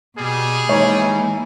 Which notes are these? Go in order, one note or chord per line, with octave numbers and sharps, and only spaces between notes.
B2 G3 G#4
E3 G#3 A#3 D#4 C#5 G#5